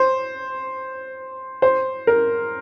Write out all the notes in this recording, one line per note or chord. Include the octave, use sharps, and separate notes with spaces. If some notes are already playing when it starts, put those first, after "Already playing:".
Already playing: C5
C5
A#4